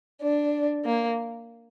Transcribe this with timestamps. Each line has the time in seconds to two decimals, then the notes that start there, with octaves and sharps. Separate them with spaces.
0.21 D4
0.85 A#3